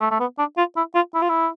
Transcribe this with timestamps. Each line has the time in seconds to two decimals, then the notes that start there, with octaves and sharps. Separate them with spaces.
0.01 A3
0.11 A3
0.20 B3
0.38 D4
0.57 F4
0.77 E4
0.95 F4
1.14 E4
1.22 F4
1.29 E4